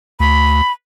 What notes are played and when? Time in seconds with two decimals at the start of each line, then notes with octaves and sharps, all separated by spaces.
0.20 D2 B5